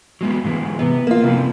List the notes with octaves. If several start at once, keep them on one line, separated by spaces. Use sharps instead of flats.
F#3 G#3 B3
G#2 E3 G#3
C3 B3
A#3 F4
G2 C3 F3